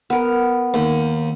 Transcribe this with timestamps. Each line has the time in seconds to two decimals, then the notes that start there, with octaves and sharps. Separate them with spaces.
0.10 B3 A#4
0.74 D#2